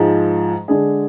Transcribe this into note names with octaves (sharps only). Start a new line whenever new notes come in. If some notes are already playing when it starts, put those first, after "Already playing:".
Already playing: G#2 F3 G#3
D3 G#3 D4 G#4